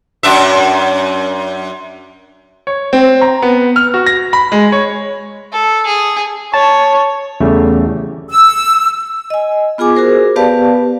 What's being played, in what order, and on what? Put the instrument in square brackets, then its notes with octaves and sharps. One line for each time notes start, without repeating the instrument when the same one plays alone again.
[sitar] F#2 D4 E5
[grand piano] C#5
C4
A#5
B3
F6
F#4
A#6
B5
G#3
C#5
[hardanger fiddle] A4
G#4
[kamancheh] C#5 [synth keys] A5
[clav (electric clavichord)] E2 C#3 G3 A3
[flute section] E6
[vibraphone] D#5 G#5
B3 F4 G#4 G#5 D6
F#4 G#4 A#4 C5
B3 G4 B4 D5 F5 A5